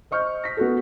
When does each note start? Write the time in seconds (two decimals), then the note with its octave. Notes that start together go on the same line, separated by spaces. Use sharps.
0.11 C5 D#5 C#6 F6 G6
0.44 A#6 B6
0.57 B3 F#4 A4